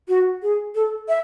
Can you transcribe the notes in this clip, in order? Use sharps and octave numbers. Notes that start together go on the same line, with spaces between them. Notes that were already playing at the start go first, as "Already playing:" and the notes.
F#4
G#4
A4
E5